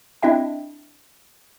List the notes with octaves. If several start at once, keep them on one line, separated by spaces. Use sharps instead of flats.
C4 D4 E4 D#5 E5 G5